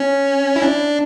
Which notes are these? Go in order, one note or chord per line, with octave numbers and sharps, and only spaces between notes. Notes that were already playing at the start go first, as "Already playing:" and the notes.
Already playing: C#4
E4
D4